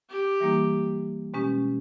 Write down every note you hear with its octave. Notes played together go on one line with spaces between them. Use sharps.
G4
E3 G3 A#3 D#4
B2 G#3 C#4 G4